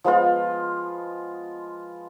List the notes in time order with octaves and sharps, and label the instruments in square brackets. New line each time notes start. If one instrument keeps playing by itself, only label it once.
[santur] F3 G#3 B3 F4